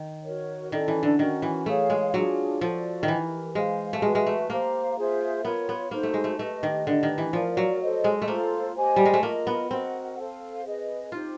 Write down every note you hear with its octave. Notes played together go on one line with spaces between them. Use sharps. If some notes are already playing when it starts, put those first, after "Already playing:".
Already playing: D#3
F#4 A#4 C#5
D#3 C#4 E4 A4 D5
E3
D3
D#3 C#4 F#4 A#4
E3
A3 G#4 C#5 F5
G#3
F#3 D4 F4 G#4
F3 F#4 A4 D5
D#3
E3 E4 G4 A#4
G#3 C5 F5 G#5
A3
G#3 F#4 B4 E5
G#3
A3
A#3 G4 C5 F5 A#5
F4 G#4 C5 E5
B3 F4 A#4 C#5
B3
A#3 D#4 F#4 A4 C5
A3
G#3
A3
A3 G4 B4 D#5
D#3
D3 D4 G4 B4 D#5
D#3
E3
F3 A#4 D5 F5
F#3
A4 C5 D#5
G#3
A3
A#3 F4 A4 C5
G4 C5 D#5 G#5
G3
G#3
A3
A#3 F4 A#4 D#5
B3
C4 F#4 A#4 D#5 F#5
A4 C5 F5
G#4 B4 D#5
D#4 F4 G4 C5